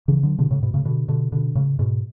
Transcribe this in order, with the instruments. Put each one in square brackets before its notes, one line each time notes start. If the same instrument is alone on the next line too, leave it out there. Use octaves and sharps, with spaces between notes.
[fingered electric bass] C#3 E3
D3 F#3
B2 D3
A2 C#3
G#2 B2
A2 C#3
B2 D3
B2 D3
B2 D3
A2 C#3
G#2 B2